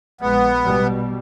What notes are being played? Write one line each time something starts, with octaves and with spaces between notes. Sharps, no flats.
A#1 G#3 B3
B2 G3